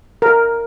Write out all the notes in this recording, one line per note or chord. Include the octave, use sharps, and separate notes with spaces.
A#4